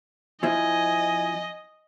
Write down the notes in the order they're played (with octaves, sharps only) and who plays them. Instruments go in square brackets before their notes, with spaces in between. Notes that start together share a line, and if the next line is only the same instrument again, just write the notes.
[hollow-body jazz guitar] F3 C4 E4 [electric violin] D#5 [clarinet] G#5